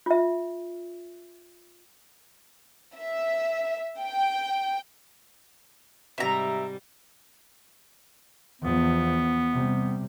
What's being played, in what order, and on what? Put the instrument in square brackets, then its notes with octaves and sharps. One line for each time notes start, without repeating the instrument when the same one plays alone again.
[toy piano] F4 E5
[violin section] E5
G5
[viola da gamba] G#2 C3 G3 [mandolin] E5 A#5
[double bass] E2 F3 [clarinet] B3
[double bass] C3 G3